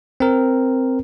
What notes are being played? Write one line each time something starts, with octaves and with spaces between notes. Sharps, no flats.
C4 A#4